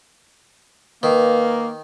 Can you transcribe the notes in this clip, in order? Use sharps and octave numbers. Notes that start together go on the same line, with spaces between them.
D#3 A#3 B4